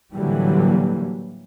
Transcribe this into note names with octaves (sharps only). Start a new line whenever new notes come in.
A2 D3 E3 F#3 G3 A#3